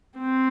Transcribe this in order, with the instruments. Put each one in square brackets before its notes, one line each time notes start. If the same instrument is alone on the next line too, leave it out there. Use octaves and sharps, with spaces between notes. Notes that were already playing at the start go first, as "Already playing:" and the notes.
[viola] C4